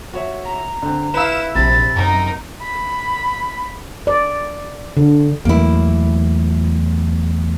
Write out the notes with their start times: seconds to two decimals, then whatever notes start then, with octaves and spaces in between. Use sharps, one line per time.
0.13 F#4 C#5 E5
0.45 A#5
0.83 D3 C4
1.14 E4 B4 F5 E6 E7
1.55 A#1 C3 C4 B5 A6
1.96 F#2 D#4 A#4
2.62 B5
4.07 D5
4.97 D3
5.45 E2 A2 F#3 A#3 E4